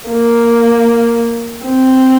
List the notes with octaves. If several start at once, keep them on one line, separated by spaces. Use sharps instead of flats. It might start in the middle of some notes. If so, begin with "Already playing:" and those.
A#3
C4